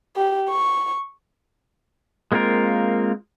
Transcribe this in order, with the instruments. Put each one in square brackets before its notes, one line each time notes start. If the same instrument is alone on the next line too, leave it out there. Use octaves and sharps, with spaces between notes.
[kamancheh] G4
C#6
[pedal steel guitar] G#3 A#3 C4 F4 A#4